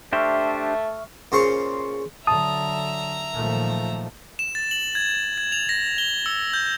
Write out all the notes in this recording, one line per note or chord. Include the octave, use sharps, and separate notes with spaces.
A3 D4 G4 C5 E5 C#6 F6
A#2 C#3 C5 A#5 C6 C#6
D3 F#3 E5 A5 A#5 D#6
A#2 D#3 F3 F#3 A3
E7
A6
F#7
G#6
G#6
F7
A#6
G7
E6
G6